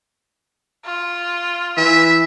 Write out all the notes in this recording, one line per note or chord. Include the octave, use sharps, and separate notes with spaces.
F4
E3 E5